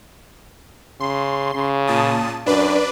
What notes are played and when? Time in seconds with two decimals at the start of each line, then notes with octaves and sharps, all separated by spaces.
1.00 C#3 C6
1.54 C#3
1.87 A#2 A5 D#6
2.46 F#2 D4 B4 D5